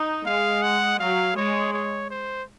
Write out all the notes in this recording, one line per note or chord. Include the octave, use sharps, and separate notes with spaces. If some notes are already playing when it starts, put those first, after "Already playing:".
Already playing: D#4
G#3 F5
F#5
F#3 F5
G#3 C#5
C#5
C5